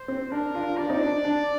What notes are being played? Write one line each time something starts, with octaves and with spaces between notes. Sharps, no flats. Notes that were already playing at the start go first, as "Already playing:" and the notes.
Already playing: C5
C4
D4 A#4
D4 F4
D4 F4 D5
C4 D#4
D4
D4
D4